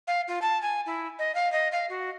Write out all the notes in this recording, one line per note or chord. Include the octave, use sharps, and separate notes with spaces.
F5
F4
A5
G#5
E4
D#5
F5
D#5
F5
F#4